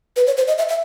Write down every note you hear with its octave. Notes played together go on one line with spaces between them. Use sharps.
B4
C#5
C5
D#5
E5
E5